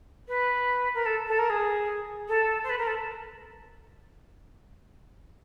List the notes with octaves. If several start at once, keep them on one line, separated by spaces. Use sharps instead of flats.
B4
A#4
A4
A4
A#4
G#4
A4
C5
B4
A#4
A4